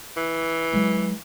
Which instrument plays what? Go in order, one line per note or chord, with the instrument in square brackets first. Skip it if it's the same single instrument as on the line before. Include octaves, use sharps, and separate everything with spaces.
[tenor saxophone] E3
[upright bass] F#3 G#3